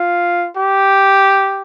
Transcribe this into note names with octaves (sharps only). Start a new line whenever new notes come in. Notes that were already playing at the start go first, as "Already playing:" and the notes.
Already playing: F4
G4